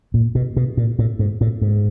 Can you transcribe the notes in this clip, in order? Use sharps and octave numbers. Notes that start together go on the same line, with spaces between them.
A#2
B2
B2
A#2
A2
G#2
A2
G#2